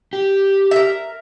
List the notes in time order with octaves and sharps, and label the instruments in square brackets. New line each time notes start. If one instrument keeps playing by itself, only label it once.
[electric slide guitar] G4
[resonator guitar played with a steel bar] A#4 E5